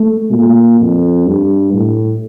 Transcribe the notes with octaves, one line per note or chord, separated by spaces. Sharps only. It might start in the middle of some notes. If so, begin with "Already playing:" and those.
Already playing: A3
A#2
F2
G2
A2